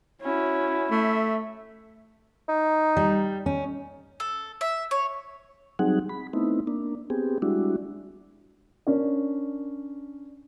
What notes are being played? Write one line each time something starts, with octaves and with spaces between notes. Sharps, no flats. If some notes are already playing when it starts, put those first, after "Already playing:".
C#4 E4 F#4
A3 E5
D#4
G3
C#4
A4
E5
C#5
F#3 G3 C4 D#4 G#4 F#5
B5
A3 B3 C4 D#4 E4
A#3 D4
B3 C4 G4 G#4
G3 G#3 D4 E4 F#4
C#4 D4 A#4 D5